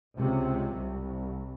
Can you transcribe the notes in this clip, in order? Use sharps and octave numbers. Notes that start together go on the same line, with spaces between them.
C#2 C3
C2